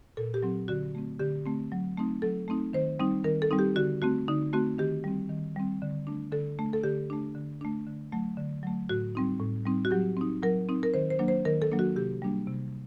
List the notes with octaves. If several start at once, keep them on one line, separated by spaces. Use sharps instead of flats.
A#2 A4
G4
F#3 C4
D3 F#4
A3 C4
D3 G4
A3 C4
F#3
A3 C4 D#4
F#3 A4
A3 C4 D#4
D#3 C5
G3 C4 D#4
D#3 A#4
A4
G3 C4 D#4
G4
D3 F#4
A3 C4 F#4
D3 D#4
A3 C4 F#4
D#3 G4
G3 C4
D#3
G3 C4
D3
A3 D4
D3 A4
A3 D4
A4
D3 G4
A3 D4
D3
A3 D4
D3
F#3 A3
D3
F#3 A3
A2 F#4
G3 C4 D#4
A2
G3 C4 D#4
F#4
F#3 G4
C4 D#4
F#3 A#4
C4 D#4
A#4
D#3 C5
C5
F#3 A#3 D4
C5
D#3 A#4
A4
F#3 A#3 D4
F#4
C3 G4
G3 A#3 D4
C3